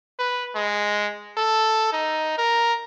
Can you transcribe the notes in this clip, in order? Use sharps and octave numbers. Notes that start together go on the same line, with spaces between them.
B4
G#3
A4
D#4
A#4